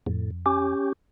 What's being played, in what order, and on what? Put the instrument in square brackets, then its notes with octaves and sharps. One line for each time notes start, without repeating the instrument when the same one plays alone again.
[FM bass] F2 [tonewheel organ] A2
[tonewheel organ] C#4 G4